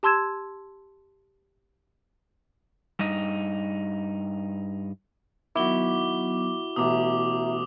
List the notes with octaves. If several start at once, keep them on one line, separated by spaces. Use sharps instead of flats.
G4 A5 C6 E6 G#6 E7
G2 D#4
D#3 F#3 B3 E4 F#4 D6 G7
A1 B2 E5 A#5 D6 D#6